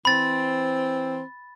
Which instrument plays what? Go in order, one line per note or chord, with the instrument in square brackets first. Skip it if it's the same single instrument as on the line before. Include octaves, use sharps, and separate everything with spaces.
[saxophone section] E3 C4 [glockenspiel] B5 A6